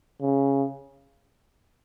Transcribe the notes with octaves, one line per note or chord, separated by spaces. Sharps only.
C#3